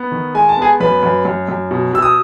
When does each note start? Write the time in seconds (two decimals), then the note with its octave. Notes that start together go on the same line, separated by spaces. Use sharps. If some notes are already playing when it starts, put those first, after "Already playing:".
Already playing: B3
0.12 D#3
0.34 G#3 G#5
0.49 A5
0.57 B3
0.62 G#4 G#5
0.80 F#2 B4 B5
1.03 F#2
1.25 F#2
1.49 F#2
1.71 B2
1.93 B2 E6
2.02 D#6